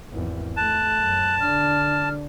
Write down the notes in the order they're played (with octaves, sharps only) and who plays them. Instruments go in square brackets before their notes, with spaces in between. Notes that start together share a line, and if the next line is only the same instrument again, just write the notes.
[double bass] G#1 E2
[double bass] A3 [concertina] A5 [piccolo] F#6
[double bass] F#2
[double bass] D3 D4 [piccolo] F6